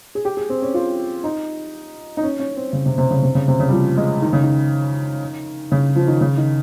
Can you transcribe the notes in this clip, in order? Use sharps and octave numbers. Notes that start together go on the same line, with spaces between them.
G#4
G4
G#4
C4
C#4
F4
D#4
D#4
C#4
C#4
C4
C#3
C3
C3
C#3
C3
C#3
C3
C#3
G3
F3
G#3
D#3
C#3
D#3
C#3
F3
D#3
C#3
D#3